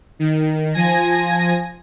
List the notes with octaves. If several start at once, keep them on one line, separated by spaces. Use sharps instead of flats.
D#3
F3 G#5 A#6